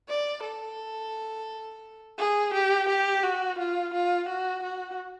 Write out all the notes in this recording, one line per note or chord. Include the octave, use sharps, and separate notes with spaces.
D5
A4
G#4
G4
G4
F#4
F4
F4
F#4
F#4